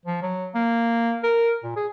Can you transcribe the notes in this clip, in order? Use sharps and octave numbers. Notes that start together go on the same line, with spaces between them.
F3
F#3
A#3
A#4
A#2
G#4